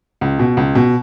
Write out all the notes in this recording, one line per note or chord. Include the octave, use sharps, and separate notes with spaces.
C#2
B2
C#2
B2